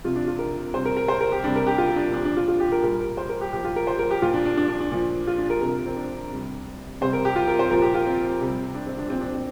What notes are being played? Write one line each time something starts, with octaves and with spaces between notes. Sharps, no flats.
C3 F3 F4
D4
F4
A#4
C3 G3 C5
A#4
A#4
C5
A#4
G4
C3 G3 D4
A#4
G4
F4
D4
A#2 F3 D4
D4
F4
F4
G4
A#4
A#2 G3 A#4
A#4
C5
A#4
G4
A#2 F3 G4
F4
A#4
C5
A#4
G4
A#2 F3 F4
D4
D4
D4
D4
D4
A#2 F3
F4
D4
A#4
C3 F3 A#4
C4
D4
C3 G3
C3 G3 C5
A#4
G4
F4
A#4
C5
A#2 F3 A#4
G4
F4
C4
C3 G3
D4
C4
D4
A#2 F3 C4
D4
C4